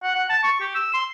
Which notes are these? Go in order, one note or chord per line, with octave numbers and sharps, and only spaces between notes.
F#5
F#5
A5
C#6
G4
E6
C6